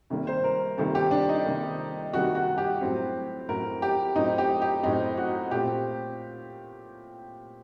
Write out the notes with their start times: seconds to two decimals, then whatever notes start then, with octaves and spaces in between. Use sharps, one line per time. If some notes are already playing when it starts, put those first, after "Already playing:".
0.10 C3 D#3 G3 A#3
0.27 C5
0.44 A#4
0.77 C3 D#3 G3 A#3 A4
0.95 G4
1.11 D4
1.29 D#4
1.46 C3 D#3 G3 A#3
2.14 C3 D#3 G3 A#3 F#4
2.35 F#4
2.58 G4
2.81 A2 F#3 C4
3.49 A2 F#3 C4 A#4
3.82 G4
4.16 A2 F#3 C4 D#4
4.38 G4
4.62 G4
4.83 A2 F#3 C4 D#4
5.17 F#4
5.51 A#2 A3 C4 G4